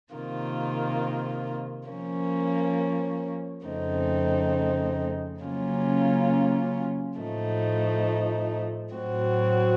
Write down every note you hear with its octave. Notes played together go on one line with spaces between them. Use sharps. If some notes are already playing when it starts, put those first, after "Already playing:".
C3 D#3 A#3 F4
F3 A#3 C#4
F2 C#3 A3 C4 D#4
C#3 F#3 A#3 C#4 F4
A2 F3 A3 D#4
A2 F#3 C4 F#4